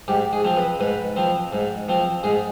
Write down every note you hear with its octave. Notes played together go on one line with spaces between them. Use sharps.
G#2 G4
G#4
F3 C4
B4
G#2 B4
F3 C4
G#2
F3 C4
G#2 G#4